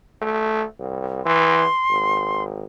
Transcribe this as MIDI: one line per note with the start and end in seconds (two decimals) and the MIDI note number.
0.22 0.64 57
0.79 1.25 36
1.25 1.65 52
1.25 2.44 84
1.90 2.66 32